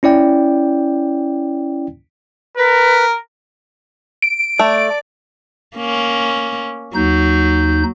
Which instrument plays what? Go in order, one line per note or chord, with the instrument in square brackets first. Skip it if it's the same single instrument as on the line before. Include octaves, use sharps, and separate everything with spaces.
[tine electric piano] C#4 E4 D5 G5
[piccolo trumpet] A#4 [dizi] B4
[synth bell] D7
[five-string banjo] A3 [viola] D5
[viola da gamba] A#3 C#4
[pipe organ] D#2 D#4 G6 [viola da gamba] F#3